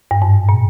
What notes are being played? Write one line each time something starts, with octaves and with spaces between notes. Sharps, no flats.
G2
G#2
A#2